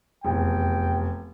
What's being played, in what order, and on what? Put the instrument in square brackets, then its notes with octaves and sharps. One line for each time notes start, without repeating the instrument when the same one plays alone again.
[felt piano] F1 E2 [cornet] G5